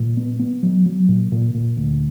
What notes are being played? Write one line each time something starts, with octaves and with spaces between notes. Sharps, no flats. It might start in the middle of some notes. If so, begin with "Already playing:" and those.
Already playing: A#2
B3
B3
F#3
F#3
A#2
A#2
A#2
D2